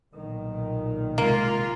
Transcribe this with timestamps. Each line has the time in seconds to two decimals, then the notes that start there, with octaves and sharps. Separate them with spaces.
0.12 B1 A#2 D#3
1.18 C3 G#3 A#3 F4